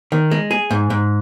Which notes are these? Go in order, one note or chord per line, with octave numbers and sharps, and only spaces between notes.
D#3
G#3
G#4
G#2
G#2